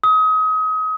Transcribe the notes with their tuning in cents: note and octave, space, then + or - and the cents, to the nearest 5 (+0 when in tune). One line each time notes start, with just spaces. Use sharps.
D#6 +30